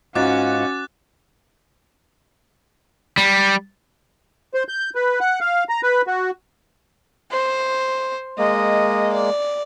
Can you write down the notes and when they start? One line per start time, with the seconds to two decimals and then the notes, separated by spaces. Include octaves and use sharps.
0.15 G#2 C#4 F4 F#4 D6 F#6 A6
3.18 G3
4.54 C5
4.68 G6
4.95 B4
5.20 F#5
5.41 F5
5.69 A#5
5.83 B4
6.07 F#4
7.31 C5
8.38 G#3 A#3 D#5
9.13 D5